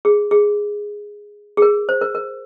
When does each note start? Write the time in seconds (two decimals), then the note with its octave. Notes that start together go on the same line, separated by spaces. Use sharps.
0.05 G#4
0.31 G#4
1.57 G#4
1.62 A#4
1.89 C5
2.01 A#4
2.15 A#4